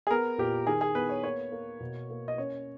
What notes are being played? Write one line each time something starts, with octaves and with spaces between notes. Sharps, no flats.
G#4
B3 A#4
A#2 G4
D#3 G#4
G#4
B3 B4
C#5
A#3 C#5
A#3
B2
A#3
D#5
C#4 C#5